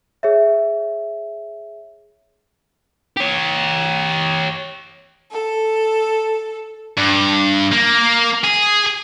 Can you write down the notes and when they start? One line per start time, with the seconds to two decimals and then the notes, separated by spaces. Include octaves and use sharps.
0.23 G#4 C#5 E5
3.17 G4 C#5
5.33 A4
6.98 G2
7.72 A#3
8.44 G#4